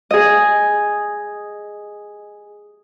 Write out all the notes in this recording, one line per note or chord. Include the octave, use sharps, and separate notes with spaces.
G#4 D#5